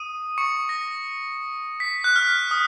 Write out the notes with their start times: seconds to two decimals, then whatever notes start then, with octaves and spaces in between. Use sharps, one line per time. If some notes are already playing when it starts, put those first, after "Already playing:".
Already playing: D#6 D#7
0.38 C#6 C#7
0.69 A#6
1.80 B6
2.04 F#6
2.16 F6
2.51 D#6